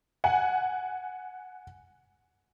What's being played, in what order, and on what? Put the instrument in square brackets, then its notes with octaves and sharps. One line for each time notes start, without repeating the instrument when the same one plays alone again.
[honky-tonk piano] F#5 G#5